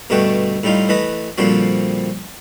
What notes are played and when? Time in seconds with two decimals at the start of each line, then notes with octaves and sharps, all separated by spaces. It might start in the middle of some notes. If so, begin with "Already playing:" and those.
0.10 G2 B2 D3 A3 F#4 G5
0.63 A2 G3 D#4 F4
0.89 E3 A3 B4 D#5
1.38 A#2 D3 F3 G3 C4 F#4